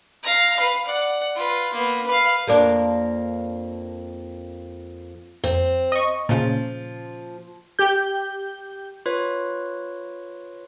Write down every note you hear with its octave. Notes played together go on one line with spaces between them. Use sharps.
F5 A#5
B4 F5
D5 F#5
F4 B4
A#3 B3
B4 F5
F2 A#3 D4
F2 C4
D#5 C#6
A#2 C#3 F3
G4 G6
F4 B4 C#5